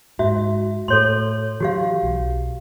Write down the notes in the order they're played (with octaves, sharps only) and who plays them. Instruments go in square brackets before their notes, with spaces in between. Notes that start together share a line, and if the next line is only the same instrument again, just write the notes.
[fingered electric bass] G#2 [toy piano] F#4 E5
[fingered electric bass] A2 [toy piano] A4 C#5 C6
[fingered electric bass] E3 F#3 [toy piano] F#4 G4 F5
[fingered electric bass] B1